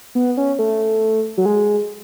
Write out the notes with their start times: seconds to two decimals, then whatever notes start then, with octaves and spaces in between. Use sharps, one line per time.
0.15 B3
0.37 C#4
0.59 A3
1.37 F#3
1.46 G#3